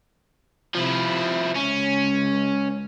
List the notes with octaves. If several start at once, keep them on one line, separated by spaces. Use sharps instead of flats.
C3 F3 E4
C#2 C#4